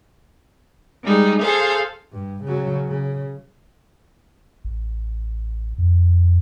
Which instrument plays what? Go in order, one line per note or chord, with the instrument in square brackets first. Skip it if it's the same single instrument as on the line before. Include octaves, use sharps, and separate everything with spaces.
[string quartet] G3 G#3 D#4
G#4 A4 C5 F5
[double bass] G2
C#3 F#3
C#3
[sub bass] A1
F2